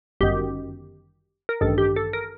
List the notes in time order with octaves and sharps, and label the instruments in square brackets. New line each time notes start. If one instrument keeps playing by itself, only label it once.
[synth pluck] G1 F#2 D#3 G4
A#4
A1 G2 D#3 A4
G4
A4
A#4